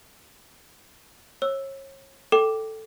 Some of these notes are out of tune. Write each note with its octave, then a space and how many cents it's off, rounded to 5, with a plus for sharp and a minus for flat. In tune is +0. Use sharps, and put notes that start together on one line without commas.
C#5 -35 E6 +0
A4 +0 G5 -10 D6 +0